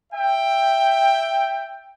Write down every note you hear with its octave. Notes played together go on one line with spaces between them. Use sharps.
E5 G5